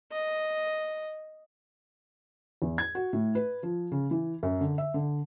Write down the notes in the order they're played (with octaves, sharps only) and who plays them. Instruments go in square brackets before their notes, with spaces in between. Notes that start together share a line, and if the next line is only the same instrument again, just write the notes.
[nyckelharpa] D#5
[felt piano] E2
G#6
F#4
A2
B4
F3
C#3
E3
F#2
D3
E5
D3